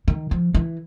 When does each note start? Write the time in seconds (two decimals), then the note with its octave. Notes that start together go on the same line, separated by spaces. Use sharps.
0.08 D#3
0.31 F3
0.55 E3